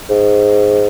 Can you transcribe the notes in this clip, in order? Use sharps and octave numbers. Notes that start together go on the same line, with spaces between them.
G#2